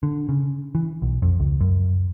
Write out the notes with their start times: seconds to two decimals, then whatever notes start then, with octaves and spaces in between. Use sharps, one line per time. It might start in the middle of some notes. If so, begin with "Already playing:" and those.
0.03 D3
0.29 C#3
0.75 E3
1.02 B1
1.22 F2
1.40 C#2
1.60 F#2